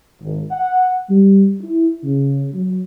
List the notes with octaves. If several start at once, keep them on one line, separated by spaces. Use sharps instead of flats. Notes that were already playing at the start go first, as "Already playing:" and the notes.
G#1
F#5
G3
E4
C#3
F#3